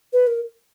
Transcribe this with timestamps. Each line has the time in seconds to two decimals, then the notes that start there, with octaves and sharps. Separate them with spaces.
0.13 B4
0.27 A#4